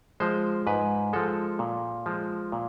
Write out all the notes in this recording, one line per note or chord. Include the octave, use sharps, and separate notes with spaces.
F3 G#3 C5
G#2 B4
F3 G#3 A4
A#2
F3 G#3
A#2